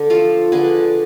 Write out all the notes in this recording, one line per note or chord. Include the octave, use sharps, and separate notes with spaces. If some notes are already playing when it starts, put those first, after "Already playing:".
Already playing: D3 D4
F3 A3 F4 A4
D3 G#4 B4